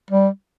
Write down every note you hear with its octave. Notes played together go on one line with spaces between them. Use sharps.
G3